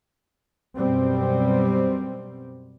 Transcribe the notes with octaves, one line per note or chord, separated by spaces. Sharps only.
F#2 B2 G3 C4